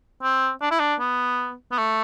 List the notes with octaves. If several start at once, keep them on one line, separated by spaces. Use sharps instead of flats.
C4
D4
E4
D4
B3
B3
A3